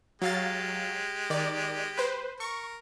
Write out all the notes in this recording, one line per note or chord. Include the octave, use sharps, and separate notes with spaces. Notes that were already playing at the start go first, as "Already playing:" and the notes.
F#3 G#3 G4 F5 A6
D#3 D5
B4 C5
A#4 C#6